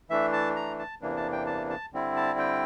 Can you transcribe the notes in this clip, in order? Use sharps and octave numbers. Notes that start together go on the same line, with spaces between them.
E3 A3 D4 E5
A5
A#5
A5
E2 C3 E3 A#3 D4
A5
G5
A5
A5
D3 G3 C4 E4
A5
G5